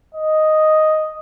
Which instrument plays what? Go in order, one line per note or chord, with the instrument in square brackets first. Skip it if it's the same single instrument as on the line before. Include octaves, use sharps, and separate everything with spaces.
[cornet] D#5